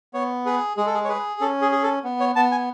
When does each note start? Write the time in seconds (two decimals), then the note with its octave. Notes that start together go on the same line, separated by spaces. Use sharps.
0.14 B3 C#5
0.45 G#4 B4
0.77 G#3 G#4
0.86 A4
0.94 G#4
1.04 C#5
1.08 G#4 B4
1.41 C#4 A4
1.61 G#4
1.72 G#4
1.83 A4
2.04 B3
2.20 C#5
2.36 B3 A5
2.51 G#5